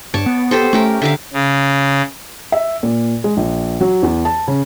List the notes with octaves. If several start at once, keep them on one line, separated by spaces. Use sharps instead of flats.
G2 C#5 A5 D6
B3
G4 A4 C5
A3 C#4 G4 A#4
D3 A#4 E5 F5
C#3
E5
A#2
G#3
A#1
F#3
E2
A5
C#3